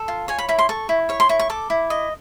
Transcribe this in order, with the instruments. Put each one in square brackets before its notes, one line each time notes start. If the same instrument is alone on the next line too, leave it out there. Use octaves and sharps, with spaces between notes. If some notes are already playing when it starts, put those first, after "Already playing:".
Already playing: [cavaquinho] A4
F4
C#5 G#5
B5
E4 B5
C6
A4 C#6
E4
C#5 C#6
C6
E4 C#6
C#6
A4 D6
E4
D#5